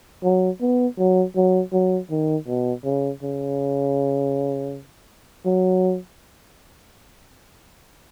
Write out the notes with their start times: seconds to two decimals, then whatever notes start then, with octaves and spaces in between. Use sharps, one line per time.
0.24 F#3
0.61 B3
0.98 F#3
1.36 F#3
1.73 F#3
2.10 D#3
2.47 B2
2.84 C#3
3.23 C#3
5.45 F#3